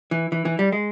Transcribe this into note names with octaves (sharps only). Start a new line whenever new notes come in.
E3
E3
E3
G3
G#3